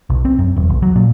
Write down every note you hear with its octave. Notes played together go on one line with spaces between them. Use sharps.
B1
C4
F#2
E1
B1
F#3
A#2